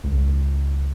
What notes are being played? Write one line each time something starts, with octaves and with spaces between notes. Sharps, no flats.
C#2